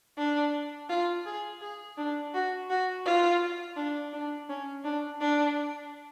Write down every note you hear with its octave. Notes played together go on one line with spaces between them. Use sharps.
D4
F4
G#4
G#4
D4
F#4
F#4
F4
D4
D4
C#4
D4
D4